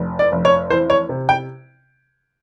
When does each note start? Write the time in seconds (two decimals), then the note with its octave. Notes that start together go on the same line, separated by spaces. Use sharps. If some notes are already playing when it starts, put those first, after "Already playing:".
Already playing: F1
0.19 D5
0.32 F1
0.45 C#5
0.70 E3 C5
0.90 C#5
1.09 C3
1.29 G5